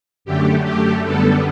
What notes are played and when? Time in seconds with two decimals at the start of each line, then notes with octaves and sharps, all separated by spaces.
0.25 F#2 D3 A3 G4
0.65 G4
1.03 F#2 D3 G3 B3 A4